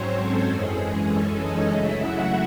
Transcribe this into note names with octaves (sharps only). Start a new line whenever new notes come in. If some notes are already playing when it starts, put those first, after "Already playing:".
Already playing: G#2 F#3 C4 C#4 C5 C#5
A4
F#2 E3 G#3 C#4 G#4
A4
D#4 D#5
C#3 F#3 A3 E4 E5
F#4 F#5